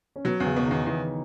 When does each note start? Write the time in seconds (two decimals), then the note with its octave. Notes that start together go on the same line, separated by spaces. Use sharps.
0.16 C#4
0.25 B2 F#3 B3
0.40 E2
0.46 C#3 C#4
0.57 B2
0.66 D#3 D#4
0.71 E2
0.86 E2 E3 E4